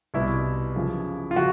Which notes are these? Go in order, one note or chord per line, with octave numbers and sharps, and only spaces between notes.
C2 B2 E4
F#2 C#3 F3
F4
C#3 F3 F#4